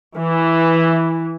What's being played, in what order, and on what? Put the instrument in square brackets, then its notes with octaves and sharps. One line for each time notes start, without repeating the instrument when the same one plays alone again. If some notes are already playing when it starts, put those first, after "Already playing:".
[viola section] E3